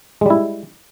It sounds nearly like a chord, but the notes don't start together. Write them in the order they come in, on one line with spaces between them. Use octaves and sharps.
G#3 G3 E4